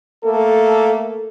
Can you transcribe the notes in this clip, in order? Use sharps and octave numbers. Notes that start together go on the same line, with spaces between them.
A3 A#3 A4